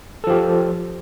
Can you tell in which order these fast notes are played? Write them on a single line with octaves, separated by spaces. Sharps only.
A4 F3 G4